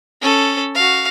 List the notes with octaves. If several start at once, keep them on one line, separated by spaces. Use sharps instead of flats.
C#4 A4
F#4 F5